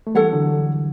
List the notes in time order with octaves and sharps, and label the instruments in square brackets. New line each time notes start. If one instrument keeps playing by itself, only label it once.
[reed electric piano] A3
[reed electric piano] E3 G3 [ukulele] A4 C#5 F#5
[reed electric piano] D3 F#3